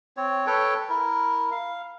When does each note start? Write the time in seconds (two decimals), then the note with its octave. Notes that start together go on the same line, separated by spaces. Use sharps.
0.17 C4 C#5
0.47 A4 B4 C#5 G5
0.89 E4 A#4
1.52 F5